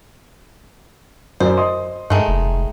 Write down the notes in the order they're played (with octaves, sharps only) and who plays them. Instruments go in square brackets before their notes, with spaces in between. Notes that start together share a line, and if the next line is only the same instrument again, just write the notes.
[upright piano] F#2 D5 [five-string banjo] C5
[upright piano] D#5 C6 D#6
[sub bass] G2 [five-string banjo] D#3 G#3 A3
[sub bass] F1